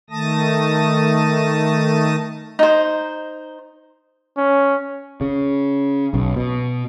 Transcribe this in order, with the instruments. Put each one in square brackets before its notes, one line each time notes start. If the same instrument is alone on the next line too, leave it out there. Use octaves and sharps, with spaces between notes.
[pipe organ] D#3 A3 A5 D#6 A#6
[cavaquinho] D#4 C5
[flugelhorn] C#4
[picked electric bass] C#3
B1
B2